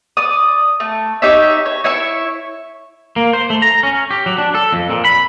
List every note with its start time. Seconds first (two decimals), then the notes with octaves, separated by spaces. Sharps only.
0.17 D5 D#6
0.80 A3
1.22 D#4 G4 C#5 E5
1.66 C#5
1.84 E4 C#5 E5 C#6
3.16 A#3
3.33 C5
3.50 A3
3.62 A#5
3.83 C#4
4.11 G4
4.26 F#3
4.38 D4
4.55 A4
4.73 F2
4.90 A#2
5.05 B5